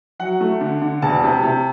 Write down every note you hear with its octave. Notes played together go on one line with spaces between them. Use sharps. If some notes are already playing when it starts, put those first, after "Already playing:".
F#3 F#5
A3
D3
D3
E1 A5
C3
C3